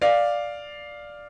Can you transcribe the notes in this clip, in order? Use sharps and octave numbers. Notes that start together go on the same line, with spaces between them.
D5 F5